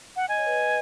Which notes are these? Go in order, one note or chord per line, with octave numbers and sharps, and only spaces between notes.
F#5
D#5 G#5
C#5
B4 D#5